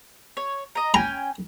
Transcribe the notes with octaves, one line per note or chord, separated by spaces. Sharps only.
C#5
D#5 A#5
C#4 G5 G#5 A#5